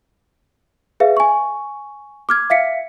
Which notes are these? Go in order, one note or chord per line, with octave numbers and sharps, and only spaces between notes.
G#4 B4 E5 F5
G#5 C#6
D6 F6 G#6
E5 F5 B6 C#7